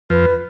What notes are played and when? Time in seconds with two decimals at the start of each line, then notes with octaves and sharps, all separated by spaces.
0.10 F2 F3 B4